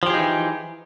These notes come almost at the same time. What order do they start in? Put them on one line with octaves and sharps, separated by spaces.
F3 G4 G#4 D#4 E3